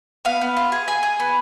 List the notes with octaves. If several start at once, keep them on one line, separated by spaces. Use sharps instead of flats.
B3 F5
B3
F4
G#4
G#4 G#5
G#4
B3